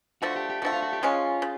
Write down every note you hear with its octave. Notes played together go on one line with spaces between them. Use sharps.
D3 F3 A3 F#4
G4
G4
D3 F3 A3 F#4
F4
F#4
G4
C#3 F3 G#3 C#4 F4
C#3